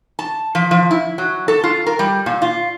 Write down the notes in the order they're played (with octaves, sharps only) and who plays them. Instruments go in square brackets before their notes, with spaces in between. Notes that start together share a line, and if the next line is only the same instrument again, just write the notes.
[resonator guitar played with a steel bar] A5
F3
F3
E4
F#3
A4
F4
A#4
G3
A#2
F4